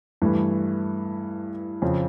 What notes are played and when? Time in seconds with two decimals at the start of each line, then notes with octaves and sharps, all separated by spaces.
0.22 G2 E3 A3 E4
1.82 F2 C#3 F3